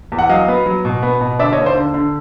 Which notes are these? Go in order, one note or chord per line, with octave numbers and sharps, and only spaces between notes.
E2
F#5
F#3 D#5 F5
B3
F#3
B2
B3
B2
D3 D5 E5
C#5 D#5
D#2
C5 D5
D3
D3